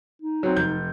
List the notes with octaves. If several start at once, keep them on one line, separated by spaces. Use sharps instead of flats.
D#4
F#3 C4
F1 G6